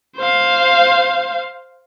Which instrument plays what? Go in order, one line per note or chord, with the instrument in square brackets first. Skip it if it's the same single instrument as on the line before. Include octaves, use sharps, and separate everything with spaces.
[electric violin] C5 F5